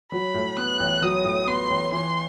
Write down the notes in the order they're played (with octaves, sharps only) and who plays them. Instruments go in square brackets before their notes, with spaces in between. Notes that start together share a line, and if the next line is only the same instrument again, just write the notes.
[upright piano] F#3 [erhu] B5
[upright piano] A2
[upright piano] B3 [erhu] F#6
[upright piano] A1
[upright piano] F#3 [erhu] D#6
[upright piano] A2
[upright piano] B3 [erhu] C6
[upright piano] A1
[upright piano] E3 [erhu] C6